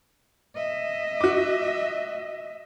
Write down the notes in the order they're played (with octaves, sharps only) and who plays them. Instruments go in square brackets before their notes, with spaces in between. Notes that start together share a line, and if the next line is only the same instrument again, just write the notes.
[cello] D#5 E5
[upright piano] F#4 D6